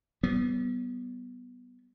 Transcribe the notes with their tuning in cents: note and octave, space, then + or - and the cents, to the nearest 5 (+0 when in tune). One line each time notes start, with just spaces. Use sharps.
G3 -40 B3 +0